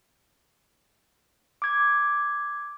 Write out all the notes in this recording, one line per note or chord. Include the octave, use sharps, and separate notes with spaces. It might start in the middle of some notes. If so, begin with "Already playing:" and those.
D6 G#6